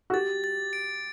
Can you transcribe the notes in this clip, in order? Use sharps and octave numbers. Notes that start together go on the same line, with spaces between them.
F#4
G4 A6
A6
D7